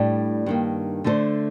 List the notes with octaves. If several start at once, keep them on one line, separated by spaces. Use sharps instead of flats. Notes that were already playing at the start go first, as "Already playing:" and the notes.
Already playing: A2 G3 D4
G2 D#3 A#3
D3 A3 D4 A4 C5